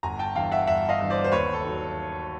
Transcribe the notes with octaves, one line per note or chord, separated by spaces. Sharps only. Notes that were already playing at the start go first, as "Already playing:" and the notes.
G1 G#5 A#5
G5 A5
G2 E3 F5 G5
E5 F#5
G1 E5 F#5
D#5 F5
G2 E3
C5 D5
C5
D#2 B4 C#5
A4
D#3 F#3